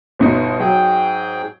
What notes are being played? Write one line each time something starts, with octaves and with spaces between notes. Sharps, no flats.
G1 B2 D#4
G#2 F#3 G#4 G5